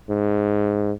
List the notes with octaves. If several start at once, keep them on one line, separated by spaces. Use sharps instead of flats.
G#2